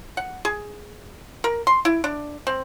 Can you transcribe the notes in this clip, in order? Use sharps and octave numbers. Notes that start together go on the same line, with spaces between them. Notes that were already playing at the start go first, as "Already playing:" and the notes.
F#5
G#4
A#4
C6
E4
D4
C4